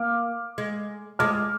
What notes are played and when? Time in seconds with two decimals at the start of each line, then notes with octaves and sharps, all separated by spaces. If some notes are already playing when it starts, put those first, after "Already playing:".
Already playing: A#3 D6 F6
0.58 G#3
1.19 G#3 D6 F6